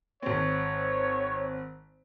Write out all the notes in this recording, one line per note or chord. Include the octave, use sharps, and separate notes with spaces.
G#1 C4 C#5